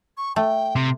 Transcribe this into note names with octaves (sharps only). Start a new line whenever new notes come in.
C#6
A3 G5
C3